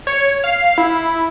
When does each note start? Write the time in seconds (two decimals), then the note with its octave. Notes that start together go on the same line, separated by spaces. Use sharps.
0.07 C#5
0.44 F5
0.78 E4